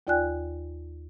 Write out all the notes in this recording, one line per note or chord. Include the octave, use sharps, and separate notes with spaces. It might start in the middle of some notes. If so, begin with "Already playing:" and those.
D#2 F4 D5 G5 G#5 F#6